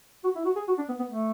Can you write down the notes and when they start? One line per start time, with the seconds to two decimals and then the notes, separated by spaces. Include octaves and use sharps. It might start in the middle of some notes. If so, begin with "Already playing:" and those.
0.24 F#4
0.35 E4
0.45 F#4
0.56 G#4
0.68 F#4
0.78 D4
0.89 B3
0.99 B3
1.10 A3